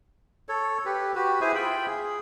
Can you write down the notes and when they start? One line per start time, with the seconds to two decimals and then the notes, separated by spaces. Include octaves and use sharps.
0.49 A4 C#5
0.86 G4 B4
1.15 F#4 G4 B4
1.41 E4 G#4 C5 G#5
1.55 F4 E5 G5 B5
1.87 G#4